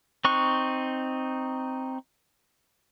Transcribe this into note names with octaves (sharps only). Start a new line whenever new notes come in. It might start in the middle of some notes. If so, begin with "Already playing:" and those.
C4 D#4 C#6 F#6